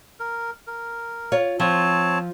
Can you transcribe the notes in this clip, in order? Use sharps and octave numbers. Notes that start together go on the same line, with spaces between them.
A#4
A#4
F4 C#5
F3 C4 C#5 A5